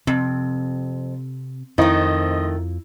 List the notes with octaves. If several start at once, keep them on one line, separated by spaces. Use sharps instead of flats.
F2 C3 C4
F2 D#3 A3 C4 E4 D#5